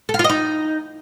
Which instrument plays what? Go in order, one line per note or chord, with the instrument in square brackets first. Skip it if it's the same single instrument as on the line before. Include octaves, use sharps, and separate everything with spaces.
[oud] A4
F5
F4
D#5
D#4